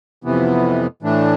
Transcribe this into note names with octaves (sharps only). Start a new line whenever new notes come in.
F2 C3 E3 B3
A2 E3 A3 D4